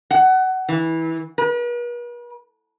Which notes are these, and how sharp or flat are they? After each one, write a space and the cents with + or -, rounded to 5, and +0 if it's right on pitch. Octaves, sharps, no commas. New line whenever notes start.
F#5 +20
E3 -20
B4 -45